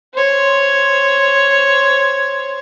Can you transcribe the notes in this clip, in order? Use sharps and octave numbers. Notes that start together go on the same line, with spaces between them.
C5 C#5